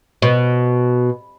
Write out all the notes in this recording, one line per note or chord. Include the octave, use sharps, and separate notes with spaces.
B2